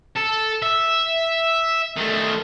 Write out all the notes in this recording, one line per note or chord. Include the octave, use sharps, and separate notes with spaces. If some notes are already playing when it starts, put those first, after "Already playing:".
A4
E5
D#3 A3